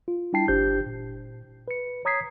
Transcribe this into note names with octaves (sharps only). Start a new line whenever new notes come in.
F4
G3 D4 E4 G5 A5 C7
G1 D4 G4 C5 G6
A#2
B4 C#7
C#5 A#5 D#6 G#6 B6 C7